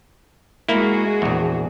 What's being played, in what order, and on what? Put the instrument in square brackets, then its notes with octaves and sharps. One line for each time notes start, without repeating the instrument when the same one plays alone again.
[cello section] G#3 F#4 G#4 [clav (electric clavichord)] A#3 E4
[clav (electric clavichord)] A#1 E2